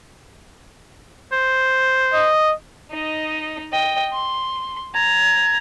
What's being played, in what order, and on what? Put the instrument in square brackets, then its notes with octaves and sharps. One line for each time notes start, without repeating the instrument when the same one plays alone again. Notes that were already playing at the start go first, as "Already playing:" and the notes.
[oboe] C5
[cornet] D#5
[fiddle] D#4 D#5
D#5 G5
C6
[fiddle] A#5 [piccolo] G#6